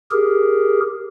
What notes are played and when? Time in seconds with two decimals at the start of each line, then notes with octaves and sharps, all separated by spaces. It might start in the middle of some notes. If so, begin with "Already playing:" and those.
0.11 G4 G#4 A#4